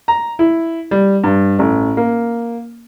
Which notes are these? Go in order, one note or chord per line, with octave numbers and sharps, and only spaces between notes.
A#5
E4
G3
G2
A1
A#3